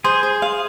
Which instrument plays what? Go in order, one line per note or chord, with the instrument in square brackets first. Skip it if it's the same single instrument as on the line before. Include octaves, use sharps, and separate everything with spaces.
[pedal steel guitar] G#4 [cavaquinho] C5
[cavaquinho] C5
F5